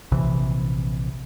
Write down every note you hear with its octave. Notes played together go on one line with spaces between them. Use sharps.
A#1 C3 E3